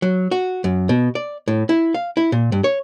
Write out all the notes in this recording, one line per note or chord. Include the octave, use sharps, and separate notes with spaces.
F#3
F#4
F#2
B2
D5
A2
E4
F5
E4
A#2
G2
C#5